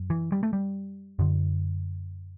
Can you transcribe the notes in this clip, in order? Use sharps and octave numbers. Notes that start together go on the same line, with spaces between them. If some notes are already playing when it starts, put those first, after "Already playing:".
Already playing: F#2
E3
G3
A3
G3
F#2 D3